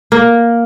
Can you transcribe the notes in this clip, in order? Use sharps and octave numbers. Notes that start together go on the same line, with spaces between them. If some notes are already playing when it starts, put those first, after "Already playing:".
A#3